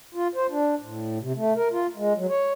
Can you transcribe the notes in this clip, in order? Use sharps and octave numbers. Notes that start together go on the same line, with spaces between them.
F4
C5
D4
A2
C3
A3
A#4
F4
G#3
F#3
C#5